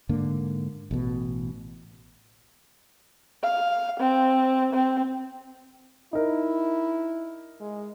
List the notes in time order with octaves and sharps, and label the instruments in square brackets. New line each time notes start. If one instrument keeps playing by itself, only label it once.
[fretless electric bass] G#2 D3 A#3
A1 B2
[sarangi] F5
C4
C4
[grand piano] D#4 A#4 [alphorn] E4
[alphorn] G#3